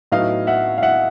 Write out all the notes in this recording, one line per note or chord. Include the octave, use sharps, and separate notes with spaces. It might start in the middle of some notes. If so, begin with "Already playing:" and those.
A2 F#3 B3 D#4 D#5 F5
E5 F#5
F5
E5 F#5